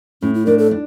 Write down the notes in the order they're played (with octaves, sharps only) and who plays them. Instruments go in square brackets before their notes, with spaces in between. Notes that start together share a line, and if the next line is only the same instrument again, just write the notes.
[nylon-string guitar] A2 [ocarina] C#4
[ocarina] E4
[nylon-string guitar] D4 [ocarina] A#4
[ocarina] A4
[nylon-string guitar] D4